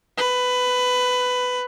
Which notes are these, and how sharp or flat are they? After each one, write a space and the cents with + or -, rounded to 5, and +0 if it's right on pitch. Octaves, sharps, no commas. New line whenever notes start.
B4 +15